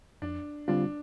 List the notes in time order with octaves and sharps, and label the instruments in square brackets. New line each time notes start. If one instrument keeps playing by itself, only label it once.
[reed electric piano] F2 [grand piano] D4
[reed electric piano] D3 G3 C4 F4 [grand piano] D4